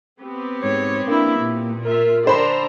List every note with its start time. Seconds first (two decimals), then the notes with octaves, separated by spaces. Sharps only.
0.21 B3 C4 G4
0.63 G#2 C#5
1.07 A#3 D4 E4
1.39 A#2
1.85 F4 A#4 E5
2.25 D3 G4 C5 D5 A#5 B5